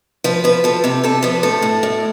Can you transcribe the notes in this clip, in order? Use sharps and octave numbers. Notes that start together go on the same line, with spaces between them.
F3 B4
F3 B4
F3 A4
C3 B4
C3 A4
F3 B4
A2 A4
A2
A2